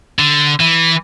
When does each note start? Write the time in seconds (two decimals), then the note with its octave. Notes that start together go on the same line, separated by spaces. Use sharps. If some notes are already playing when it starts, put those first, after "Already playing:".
0.19 D3
0.60 E3